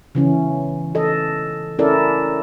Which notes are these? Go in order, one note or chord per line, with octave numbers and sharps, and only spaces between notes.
C#3 E3 C#4
A4 D#5
C#4 E4 A4 A#4 D5